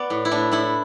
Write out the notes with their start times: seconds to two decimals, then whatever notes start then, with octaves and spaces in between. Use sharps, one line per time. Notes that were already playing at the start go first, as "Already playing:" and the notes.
Already playing: B3 D5
0.10 A2
0.25 E4
0.31 A2 D4
0.52 A2 E4